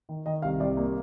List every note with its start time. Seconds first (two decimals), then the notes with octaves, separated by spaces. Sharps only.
0.09 D#3
0.26 D#3 D#5
0.42 C2 F5
0.60 C2 D5
0.77 A#3